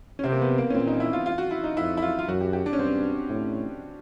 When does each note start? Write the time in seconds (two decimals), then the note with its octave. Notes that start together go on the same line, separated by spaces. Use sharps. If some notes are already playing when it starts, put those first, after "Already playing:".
0.19 C#4
0.24 C3 C4
0.32 A#3
0.41 B3
0.58 A#3
0.70 C#4
0.74 A#2 C4
0.87 D#4
1.00 E4
1.13 F4
1.26 F4
1.38 F#4
1.51 E4
1.64 D#4
1.77 F2 E4
1.97 E4
2.02 F4
2.19 F4
2.27 F#2 F#4
2.41 G4
2.53 G4
2.66 D4
2.73 C#4
2.79 G2 C4
3.29 A2